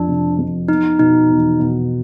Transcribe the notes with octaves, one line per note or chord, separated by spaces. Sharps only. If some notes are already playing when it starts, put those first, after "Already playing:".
Already playing: F2 F3 D4
C3
F2
B3 D#4
B2 D#4
E2
B2